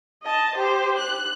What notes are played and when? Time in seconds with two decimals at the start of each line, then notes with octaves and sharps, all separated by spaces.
0.23 D#5 A5
0.55 G4 C5
0.98 F#6